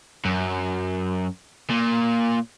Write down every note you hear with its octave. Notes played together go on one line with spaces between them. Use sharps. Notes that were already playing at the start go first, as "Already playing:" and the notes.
F#2
A#2